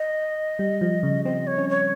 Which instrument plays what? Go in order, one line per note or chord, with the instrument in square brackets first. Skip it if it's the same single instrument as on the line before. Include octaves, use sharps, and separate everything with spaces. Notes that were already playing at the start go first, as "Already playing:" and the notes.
Already playing: [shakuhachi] D#5
[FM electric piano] G3
F3
C#3
[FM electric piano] C4 [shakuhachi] D#5
[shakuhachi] C#5
[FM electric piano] C#4
[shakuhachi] C#5